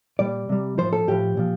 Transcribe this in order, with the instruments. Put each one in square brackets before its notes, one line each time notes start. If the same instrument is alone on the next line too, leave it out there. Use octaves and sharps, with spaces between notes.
[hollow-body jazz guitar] A#2 G3 D5
C3 G3
A2 F3 C5
A4
A2 F3 G4
A#2 F3